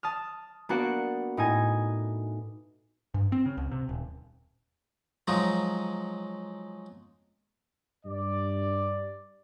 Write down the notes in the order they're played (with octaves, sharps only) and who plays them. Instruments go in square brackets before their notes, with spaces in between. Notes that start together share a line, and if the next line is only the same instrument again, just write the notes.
[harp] A5 D#6 F6
A#3 B3 D4 F#4 F#5
A2 D#4 D#5 G#5
[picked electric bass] G2
C4
C#3
C#2
C3
D#1
[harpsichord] F3 F#3 G#3 D#4
[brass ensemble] G2 D5